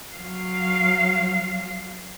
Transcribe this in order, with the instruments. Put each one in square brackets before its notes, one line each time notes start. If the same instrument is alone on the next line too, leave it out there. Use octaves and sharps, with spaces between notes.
[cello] F#3 F5